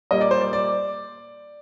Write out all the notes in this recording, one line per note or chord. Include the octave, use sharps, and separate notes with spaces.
A#2 G3 A#3 D#5
D5
C5
D5
D5